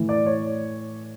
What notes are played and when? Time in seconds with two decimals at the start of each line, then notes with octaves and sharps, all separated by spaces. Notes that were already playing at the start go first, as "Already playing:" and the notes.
Already playing: A2 E3
0.09 D5
0.26 C#5